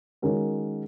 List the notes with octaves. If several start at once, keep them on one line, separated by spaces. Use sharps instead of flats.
D#3 G#3 C#4 F#4 A#4